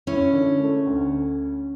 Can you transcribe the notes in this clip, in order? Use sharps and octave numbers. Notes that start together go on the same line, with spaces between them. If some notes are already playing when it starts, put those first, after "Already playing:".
C#4 E4
D3
A3
D2